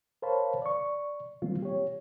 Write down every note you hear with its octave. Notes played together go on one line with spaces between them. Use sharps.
A#4 C5 C#5 F5 A5 B5
D5 C#6
D#3 F#3 G3 A#3 C4 F4
G4 C#5